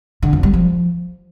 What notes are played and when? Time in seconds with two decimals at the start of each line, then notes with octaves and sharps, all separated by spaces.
0.22 D3
0.33 F2
0.43 G3
0.54 F3